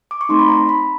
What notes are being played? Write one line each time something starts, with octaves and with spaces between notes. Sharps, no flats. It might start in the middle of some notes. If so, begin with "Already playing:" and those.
D6
C#6
A3 C4 D#4 C6
B5
A#5
B5